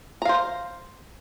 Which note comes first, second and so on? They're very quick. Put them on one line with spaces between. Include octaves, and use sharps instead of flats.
A#5 F5 C5